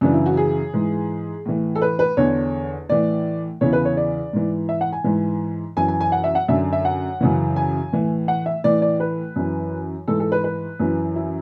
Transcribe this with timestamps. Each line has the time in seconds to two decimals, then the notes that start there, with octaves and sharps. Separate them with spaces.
0.01 F#2 C#3 E3 D4
0.14 E4
0.26 F#4
0.37 G#4
0.74 G#2 E3
1.45 A2 E3
1.75 A4
1.82 B4
1.99 B4
2.17 E2 D3 C#5
2.89 A2 E3 D5
3.61 E2 C#3 E3 C#5
3.73 B4
3.85 C#5
3.97 D5
4.33 G#2 E3
4.69 E5
4.81 F#5
4.93 G#5
5.04 G#2 E3
5.77 F#2 E3 G#5
5.88 G#5
6.01 G#5
6.12 F#5
6.24 E5
6.35 F#5
6.48 F#2 D3 E5
6.73 E5
6.85 F#5
7.21 F#2 C#3 E3
7.56 G#5
7.92 A2 E3
8.28 F#5
8.46 E5
8.64 A2 E3 D5
8.82 D5
9.00 B4
9.36 F#2 E3
10.08 G#2 E3 A4
10.20 A4
10.32 B4
10.44 B4
10.80 F#2 E3
11.16 E4